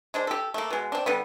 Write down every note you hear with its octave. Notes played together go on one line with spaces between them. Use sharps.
G#3 D4 C5
G4 A4
A3 A#3
B2 G#3
C4 D4
D3 G3 B3